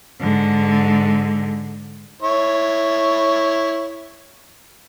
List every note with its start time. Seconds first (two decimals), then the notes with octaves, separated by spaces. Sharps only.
0.19 G#2 D3
2.22 E4 C#5